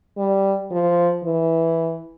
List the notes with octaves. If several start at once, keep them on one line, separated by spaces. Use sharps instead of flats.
G3
F3
E3